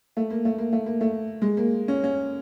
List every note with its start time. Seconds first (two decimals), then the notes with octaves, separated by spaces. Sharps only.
0.17 A3
0.31 A#3
0.45 A3
0.58 A#3
0.73 A3
0.86 A#3
1.01 A3
1.42 G#3
1.57 A#3
1.88 C#4
2.04 C#4